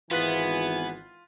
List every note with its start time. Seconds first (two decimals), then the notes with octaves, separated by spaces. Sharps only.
0.11 G#1 E3 B3 F4 G#5 F#6 B6